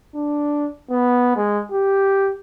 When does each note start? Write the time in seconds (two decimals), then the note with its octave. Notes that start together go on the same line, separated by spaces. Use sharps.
0.15 D4
0.90 B3
1.36 G#3
1.72 G4